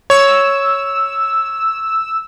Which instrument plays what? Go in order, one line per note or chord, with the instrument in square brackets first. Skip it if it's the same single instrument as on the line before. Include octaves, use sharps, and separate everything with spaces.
[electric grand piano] C#5 [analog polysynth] E6